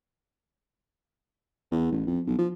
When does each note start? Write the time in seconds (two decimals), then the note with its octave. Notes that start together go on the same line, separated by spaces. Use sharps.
1.72 E2
1.92 A1
2.07 F2
2.27 B1
2.38 F3